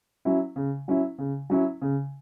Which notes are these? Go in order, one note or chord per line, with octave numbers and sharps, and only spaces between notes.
F#3 C#4 E4
C#3
F#3 C#4 E4
C#3
F#3 C#4 E4
C#3